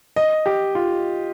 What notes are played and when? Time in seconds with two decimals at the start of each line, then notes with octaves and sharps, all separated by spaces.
0.16 D#5
0.46 G4
0.75 F4